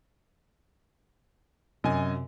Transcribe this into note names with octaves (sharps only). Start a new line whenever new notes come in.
F#2 C3 D#5 G#5